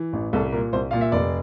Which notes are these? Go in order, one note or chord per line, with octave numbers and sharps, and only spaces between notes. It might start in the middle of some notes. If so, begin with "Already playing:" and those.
Already playing: E3
A1
C2 A4
A#2 A#4
C2 C5
A#2 F5
E5
F1 D5